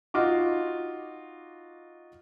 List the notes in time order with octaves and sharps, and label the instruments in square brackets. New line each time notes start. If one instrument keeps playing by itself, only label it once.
[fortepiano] D#4 F4 F#4 D6